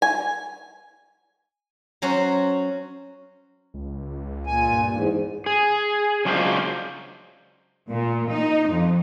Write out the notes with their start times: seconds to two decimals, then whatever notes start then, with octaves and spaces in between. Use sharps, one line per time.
0.02 G#5
2.02 F#3 C#4 F#4 C5
3.74 C#2
4.47 A#2 G#5
4.72 G2
4.91 E2 G#2
5.46 G#4
6.25 C#3 F#3 G#3 D4 F4 C5
7.89 A#2
8.30 D#4
8.69 F2